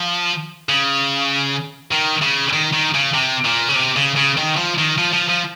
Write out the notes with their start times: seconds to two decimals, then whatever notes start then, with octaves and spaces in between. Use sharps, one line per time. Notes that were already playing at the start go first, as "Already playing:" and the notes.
Already playing: F3
0.69 C#3
1.91 D#3
2.22 C#3
2.53 D#3
2.73 D#3
2.94 C#3
3.14 C3
3.45 A#2
3.69 C#3
3.76 C3
3.96 C#3
4.16 C#3
4.37 D#3
4.57 F3
4.78 D#3
4.98 F3
5.13 F3
5.29 F3